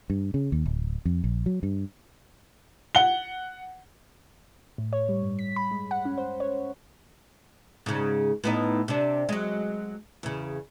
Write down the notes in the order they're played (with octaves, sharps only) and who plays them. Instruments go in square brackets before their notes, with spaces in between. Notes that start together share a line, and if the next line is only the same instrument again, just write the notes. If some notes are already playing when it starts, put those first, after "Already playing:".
[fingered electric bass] G2
C#3
D#2
D1
F2
A#1
F#3
G2
[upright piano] F#5 G7
[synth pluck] A2
C#5
G3
G2
B6
B5
G#3
F#5
C#4
C5
C#5
[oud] G#2 C#3
A2 B3 D#4
C3 D4
F#3 G#3
E2 C#3